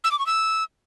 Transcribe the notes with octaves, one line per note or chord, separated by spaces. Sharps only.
E6
D6
C#6
E6